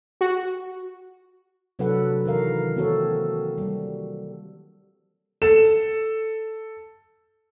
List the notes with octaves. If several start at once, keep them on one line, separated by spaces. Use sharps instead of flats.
F#4
C3 F#3 D4 A4 B4 F#5
D#3 E3 A#4 F5
A#3 C4 F#4 A4 C#5
G3
A4 E7